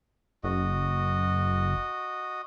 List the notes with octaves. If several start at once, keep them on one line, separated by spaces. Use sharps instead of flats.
F#1 F#4 D#5